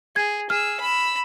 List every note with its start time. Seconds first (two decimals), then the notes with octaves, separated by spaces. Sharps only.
0.16 G#4 G#6
0.50 G#4 E6 F6
0.80 B5 E6